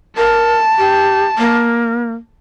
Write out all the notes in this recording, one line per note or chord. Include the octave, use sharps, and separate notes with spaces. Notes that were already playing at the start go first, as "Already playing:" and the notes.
A#4 A5
G4
A#3